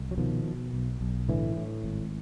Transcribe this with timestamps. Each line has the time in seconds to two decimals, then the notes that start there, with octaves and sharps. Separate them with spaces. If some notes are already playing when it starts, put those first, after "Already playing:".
Already playing: C2
0.11 F#3
0.18 B2 D#3 F3
0.45 B2
0.73 B1
1.01 B1
1.29 A2 D3 E3
1.56 A2
1.84 G#1